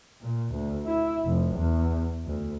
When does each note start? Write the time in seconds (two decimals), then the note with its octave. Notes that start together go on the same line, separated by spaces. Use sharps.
0.21 A#2
0.53 D2
0.86 E4
1.26 F1
1.55 E2
2.25 D2